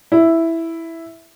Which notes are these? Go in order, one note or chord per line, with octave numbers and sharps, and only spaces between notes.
E4